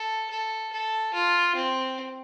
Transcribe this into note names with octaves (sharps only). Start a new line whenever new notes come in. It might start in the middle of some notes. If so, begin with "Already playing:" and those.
Already playing: A4
A4
A4
F4
C4